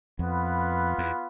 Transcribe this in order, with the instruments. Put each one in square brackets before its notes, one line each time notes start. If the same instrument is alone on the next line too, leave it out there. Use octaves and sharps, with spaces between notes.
[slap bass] F2 [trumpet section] B3 F4 B4
[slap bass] E2